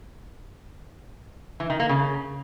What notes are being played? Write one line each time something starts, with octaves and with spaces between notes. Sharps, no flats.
E3
D#3
A#3
C#3